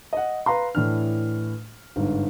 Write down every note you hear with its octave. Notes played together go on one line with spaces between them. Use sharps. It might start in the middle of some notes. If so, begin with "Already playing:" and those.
D#5 F#5
B4 F5 A#5 C6
A2 E3 D4 F6
G1 G#2